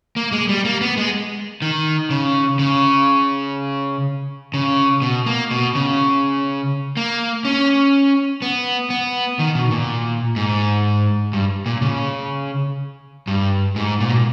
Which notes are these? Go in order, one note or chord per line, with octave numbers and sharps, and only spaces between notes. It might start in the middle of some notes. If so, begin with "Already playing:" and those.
A#3
G#3
G3
A#3
B3
G#3
D#3
C#3
C#3
C#3
B2
A#3
B2
C#3
A#3
C#4
B3
B3
D#3
B2
A#2
G#2
G2
A#2
C#3
G2
G#2
A#2
B2
A#2